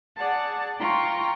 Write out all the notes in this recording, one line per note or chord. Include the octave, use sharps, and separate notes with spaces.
G#4 D5 F#5 A5
F4 G5 A#5 C6 C#6